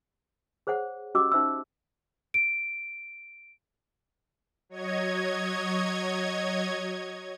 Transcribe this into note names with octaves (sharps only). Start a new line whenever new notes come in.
G#4 C5 C#5 F#5
C#4 F#4 G4 D#5 D6 E6
C#4 D#4 C5 E5 C6 E6
D7
F#3 C#5 D#5 G#6